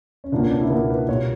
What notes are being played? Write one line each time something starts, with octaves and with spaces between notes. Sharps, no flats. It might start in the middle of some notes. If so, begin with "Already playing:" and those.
C#4
C#2 B2 A#3 D4
C#4
D4
E4
C#2 B2 A#3 A#4
B4
B1 A#2 G3 A#3 C#5